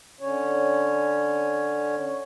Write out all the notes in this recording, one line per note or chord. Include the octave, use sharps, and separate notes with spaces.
D3 C#4 C#5